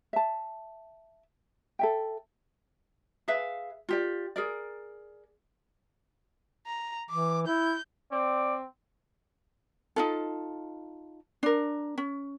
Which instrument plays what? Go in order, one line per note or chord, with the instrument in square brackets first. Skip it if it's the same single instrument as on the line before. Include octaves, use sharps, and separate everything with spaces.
[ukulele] E5 A5
A4 E5 G5
G#4 B4 E5 F5
F4 G4 D5
G#4 A#4 D5
[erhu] A#5
[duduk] E3 [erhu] D6
[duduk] E4 [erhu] G6
[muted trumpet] C4 [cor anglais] D5
[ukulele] D#4 F4 A4
D4 A#4
C#4